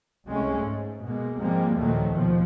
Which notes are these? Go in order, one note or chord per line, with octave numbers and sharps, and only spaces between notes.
C2 G#3 A3 C#4
G#2
B2 G#3 A#3
G#2 C3 F3 G3 G#3 A#3
D#2 A#2 D#3 F3 F#3 A3
D#2 B2 F3